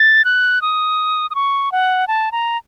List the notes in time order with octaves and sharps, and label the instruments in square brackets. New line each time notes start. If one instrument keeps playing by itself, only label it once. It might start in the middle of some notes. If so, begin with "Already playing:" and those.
Already playing: [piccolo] A6
F#6
D#6
D#6
C#6
F#5
A5
A#5